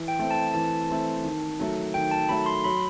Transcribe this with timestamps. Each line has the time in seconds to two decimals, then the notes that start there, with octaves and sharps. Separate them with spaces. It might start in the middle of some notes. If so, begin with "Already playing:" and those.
Already playing: E3
0.08 G5
0.19 A3 C4
0.31 A5
0.54 E3 A5
0.90 A3 C4
1.24 D#3
1.60 F#3 A3
1.94 D#3 G5
2.11 A5
2.29 F#3 A3 B5
2.46 C6
2.64 F#3 B5